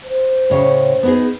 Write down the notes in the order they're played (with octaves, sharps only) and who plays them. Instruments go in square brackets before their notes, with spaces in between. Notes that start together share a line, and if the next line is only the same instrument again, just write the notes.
[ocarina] C5
[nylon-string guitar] A2 C#3 C#5
B3 D#4 G#4